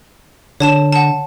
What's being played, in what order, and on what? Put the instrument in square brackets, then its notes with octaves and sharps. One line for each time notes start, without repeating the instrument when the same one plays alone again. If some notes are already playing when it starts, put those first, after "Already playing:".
[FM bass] D3 [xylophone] C#5 A5 E7
[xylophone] F#5 A5